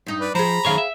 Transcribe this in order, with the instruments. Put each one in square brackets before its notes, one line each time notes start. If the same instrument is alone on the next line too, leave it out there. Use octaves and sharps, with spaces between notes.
[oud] G2 D#4
[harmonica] B4 D5
[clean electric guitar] F3 [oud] G#4 C5 [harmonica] A#5 B5
[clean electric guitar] F#2 D#3 C#5 [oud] G#4 F5
[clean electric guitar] E5